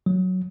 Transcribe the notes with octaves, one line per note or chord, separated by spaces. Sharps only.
F#3